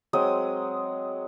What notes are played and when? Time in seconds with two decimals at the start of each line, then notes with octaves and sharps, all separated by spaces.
0.13 F#3 G#3 C4 D#6